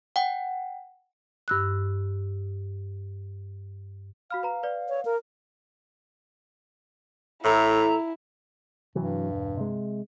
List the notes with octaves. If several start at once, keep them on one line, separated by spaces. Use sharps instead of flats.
F#5 G5
G2 E6 F#6
F#4 F5 B5 F6
B4 A#5
B4 D5
C#5
A#4
A2 E4 A4 A#5
G2 C3 E3 F#3
E1
C3 G#3